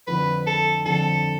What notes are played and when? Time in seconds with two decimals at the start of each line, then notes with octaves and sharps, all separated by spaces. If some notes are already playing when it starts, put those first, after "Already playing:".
0.07 F2 D3 F3 B4
0.47 A4
0.85 F2 D3 F3 A4